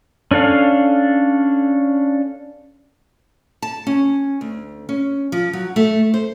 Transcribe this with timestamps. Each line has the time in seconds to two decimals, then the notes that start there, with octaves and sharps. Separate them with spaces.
0.31 C#4 D4 A4 F5
3.62 A5
3.87 C#4
4.41 D2
4.89 C#4
5.32 F3
5.53 F#3
5.76 A3
6.14 C5